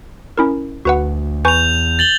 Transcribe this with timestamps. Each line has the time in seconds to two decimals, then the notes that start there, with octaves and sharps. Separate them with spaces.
0.38 C#4 E4 A#4
0.85 D2 F#4 B4 F#5
1.45 E2 B4 G#5 C#6 G6 F7
1.99 A6 F#7 G7